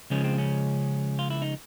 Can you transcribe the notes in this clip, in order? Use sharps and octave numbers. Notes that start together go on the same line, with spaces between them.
C#2 C#3 F3 G#3 C#4
C4
C#4
F4
E4
D#4